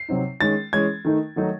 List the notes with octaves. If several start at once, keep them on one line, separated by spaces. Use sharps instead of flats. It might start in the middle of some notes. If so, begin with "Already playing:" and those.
Already playing: C7
C3 F#3 C4 D#4
D#3 G#3 C#4 A6
E3 G#3 C#4 G#6
D#3 A3 D#4
D#3 F#3 A3 D#4